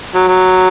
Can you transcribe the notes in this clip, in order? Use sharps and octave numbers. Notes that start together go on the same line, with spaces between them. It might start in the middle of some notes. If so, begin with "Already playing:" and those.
F#3
F#3